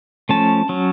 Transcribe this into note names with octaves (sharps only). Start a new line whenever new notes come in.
F3 A3 C#4 A5
F#3 C#4